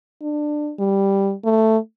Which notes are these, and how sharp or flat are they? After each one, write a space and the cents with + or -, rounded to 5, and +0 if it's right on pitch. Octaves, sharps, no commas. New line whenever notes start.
D4 +20
G3 +0
A3 +10